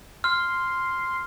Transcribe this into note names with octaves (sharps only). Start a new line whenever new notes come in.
C6 F6